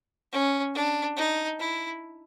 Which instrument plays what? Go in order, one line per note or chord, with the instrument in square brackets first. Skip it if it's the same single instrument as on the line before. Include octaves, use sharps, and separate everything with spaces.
[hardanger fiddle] C#4
D4
D#4
E4